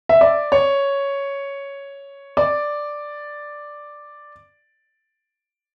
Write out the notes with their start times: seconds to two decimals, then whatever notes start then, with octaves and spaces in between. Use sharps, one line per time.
0.09 E5
0.21 D5
0.52 C#5
2.37 D5